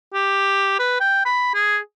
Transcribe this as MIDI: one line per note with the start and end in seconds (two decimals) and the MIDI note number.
0.14 0.75 67
0.79 0.96 71
1.00 1.21 79
1.25 1.51 83
1.54 1.78 68